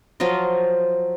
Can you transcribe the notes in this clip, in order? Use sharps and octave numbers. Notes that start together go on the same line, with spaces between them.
F3 F#3 F4 D#5